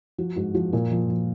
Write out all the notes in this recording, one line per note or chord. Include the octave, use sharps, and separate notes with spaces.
F3 F#4
G#2 F#4
F3 F#4
A#2 A#4
F3
F3